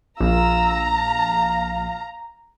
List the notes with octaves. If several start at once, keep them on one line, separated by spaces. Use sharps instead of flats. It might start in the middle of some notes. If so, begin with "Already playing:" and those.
A#1 F4 A#5 E6
F5